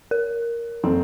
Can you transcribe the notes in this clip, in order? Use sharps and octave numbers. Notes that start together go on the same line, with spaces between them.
A#4
F#1 C4 A4